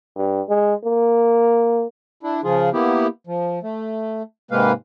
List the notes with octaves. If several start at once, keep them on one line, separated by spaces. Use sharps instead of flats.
G2
G#3
A#3
D4 E4
C#3 F3 F4 G#4
A#3 B3 E4 G4
F3
A3
G#2 C3 G#3 A#3 B4 F5